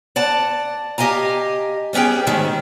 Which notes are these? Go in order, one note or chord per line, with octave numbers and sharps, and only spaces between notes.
D5 F#5 A5
G4 D#5 F5 G#5 A#5
G3 B3 C#4 G#4 G5
D2 G#2 D#3 A3 C#4